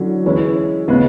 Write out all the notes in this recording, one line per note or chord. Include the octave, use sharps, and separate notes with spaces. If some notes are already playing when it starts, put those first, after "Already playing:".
Already playing: D3 F#3 C#4 E4
E3 G#3 C#4 E4 B4
C#3 G#3 B3